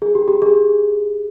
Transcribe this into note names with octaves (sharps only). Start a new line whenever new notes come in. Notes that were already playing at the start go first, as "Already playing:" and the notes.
G#4
G4
G4
G#4